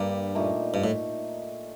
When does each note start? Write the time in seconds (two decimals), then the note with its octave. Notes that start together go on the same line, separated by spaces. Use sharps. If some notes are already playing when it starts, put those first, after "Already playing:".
Already playing: G2 D3 G3 A#3 D4
0.35 A#2 A3 D#4
0.74 G2
0.84 A2